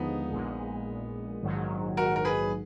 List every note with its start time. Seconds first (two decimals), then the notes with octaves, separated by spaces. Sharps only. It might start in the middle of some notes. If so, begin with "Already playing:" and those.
Already playing: D#2 D3 F3 G#3 B3 D#4
0.31 A#1 A#2 G#3
1.42 A#1 G#2 D#3 F#3
1.97 F#4 A#4
2.16 A#4
2.25 G#4 B4